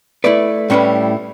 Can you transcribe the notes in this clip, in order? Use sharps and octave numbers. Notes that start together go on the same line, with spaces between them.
A3 E4 B4 D5
A2 G3 C#4 E4 B4